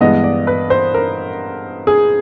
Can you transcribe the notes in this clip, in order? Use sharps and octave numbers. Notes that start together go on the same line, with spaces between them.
G2 E3 G#3 B3 D#5
D5
B4
C5
A#4
G#4